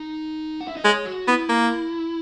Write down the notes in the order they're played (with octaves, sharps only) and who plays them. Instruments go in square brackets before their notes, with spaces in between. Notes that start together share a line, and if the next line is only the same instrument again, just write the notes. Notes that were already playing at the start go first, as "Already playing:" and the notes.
Already playing: [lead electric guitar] D#4
F#5
E5
D#5
[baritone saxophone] G#3 [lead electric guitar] C#5
[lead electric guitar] F#4
[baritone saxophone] B3 [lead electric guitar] E4
[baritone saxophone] A#3